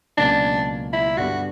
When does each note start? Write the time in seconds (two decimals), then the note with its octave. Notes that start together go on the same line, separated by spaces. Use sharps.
0.17 C#2 B2 F#3 A#3 C#4 D4
0.93 E4
1.17 G2 D3 G3 B3 F#4